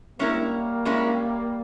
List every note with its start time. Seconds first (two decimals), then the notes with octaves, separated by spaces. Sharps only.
0.18 G3 G#3 A#3 C#4 E4 A#4
0.85 G#3 C#4 E4 A#4